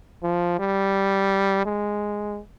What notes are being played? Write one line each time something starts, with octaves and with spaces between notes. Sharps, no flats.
F3
G3
G#3